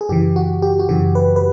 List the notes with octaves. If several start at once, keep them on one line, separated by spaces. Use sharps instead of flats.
G#4
F#2 C#3 E3 G4
F#4
G4
F#4
F#2 C#3 E3 G4
B4
B4